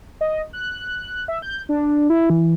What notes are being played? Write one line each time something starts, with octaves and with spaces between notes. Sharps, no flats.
D#5
F#6
E5
G6
D4
E4
E3